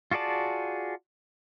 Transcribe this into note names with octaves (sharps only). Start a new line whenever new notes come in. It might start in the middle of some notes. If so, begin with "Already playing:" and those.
F4 F#4 G#4 D5 A5